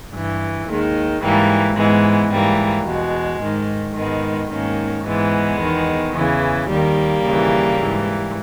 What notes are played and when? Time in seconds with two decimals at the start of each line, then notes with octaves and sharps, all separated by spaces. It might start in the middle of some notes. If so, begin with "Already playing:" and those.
0.14 G2 E3
0.69 D#2 D#3 G#3
1.23 G#2 E3 G3 A#3
1.77 G#2 E3 G#3 B3
2.32 G#2 E3 G3 A#3
2.86 E2 B2 G#3
3.42 G#2 D#3
3.96 G#2 D#3 G#3 B3
4.51 G#2 D#3 A#3 C#4
5.05 G#2 E3 G#3 B3
5.61 E2 D#3
6.14 E2 C#3 E3
6.69 D#2 D#3 G3 A#3
7.24 D#2 C#3 E3
7.78 G#2 E3